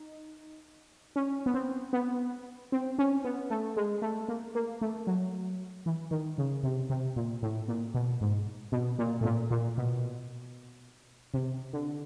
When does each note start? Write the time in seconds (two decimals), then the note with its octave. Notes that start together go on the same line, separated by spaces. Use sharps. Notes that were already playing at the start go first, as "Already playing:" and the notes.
Already playing: D#4
1.16 C#4
1.46 B3
1.54 C4
1.93 B3
2.72 C4
2.99 C#4
3.25 B3
3.50 A3
3.76 G#3
4.02 A3
4.28 A#3
4.55 A#3
4.81 A3
5.07 F#3
5.86 E3
6.11 D#3
6.38 C#3
6.63 C3
6.90 C3
7.16 A#2
7.42 A2
7.68 A#2
7.94 B2
8.21 G#2
8.72 B2
8.99 A#2
9.21 A2
9.25 A#2
9.51 A#2
9.77 B2
11.34 C3
11.73 D3